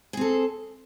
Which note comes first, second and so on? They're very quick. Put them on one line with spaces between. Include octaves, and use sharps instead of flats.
G#4 C4 A4